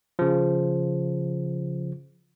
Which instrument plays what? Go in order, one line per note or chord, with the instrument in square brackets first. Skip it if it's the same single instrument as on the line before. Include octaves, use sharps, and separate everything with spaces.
[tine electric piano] C#3 F3